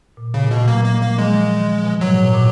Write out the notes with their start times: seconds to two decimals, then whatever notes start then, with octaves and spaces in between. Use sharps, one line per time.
0.17 A#2
0.34 A#2 C#3
0.45 A#2
0.51 B2
0.56 A#2
0.68 F#3 A#3
0.84 A#3
1.01 F3 A#3
1.10 F#3
1.18 F3 G#3
1.27 D#3
1.34 F#3
1.57 D#3
1.68 F3
1.84 B2
2.01 G#2 F#3
2.13 A#2
2.24 B2
2.34 A#2